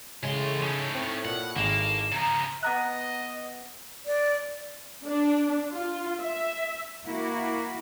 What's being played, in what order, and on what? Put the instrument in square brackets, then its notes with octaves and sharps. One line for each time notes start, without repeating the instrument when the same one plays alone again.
[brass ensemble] A2 [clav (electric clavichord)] C#3 G#3 [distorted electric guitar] E3 C6
[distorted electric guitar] C#4 D#4
[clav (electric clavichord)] C4
[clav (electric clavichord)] A#2 [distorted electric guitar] F#5
[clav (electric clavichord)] G#1 G#3 [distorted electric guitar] A#3 [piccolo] E7
[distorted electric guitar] C#3 F3 [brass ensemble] A#5
[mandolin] B3 A#5 F#6 [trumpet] D#5
[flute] D5
[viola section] D4
F4
E5
[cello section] A#3 E4 F#4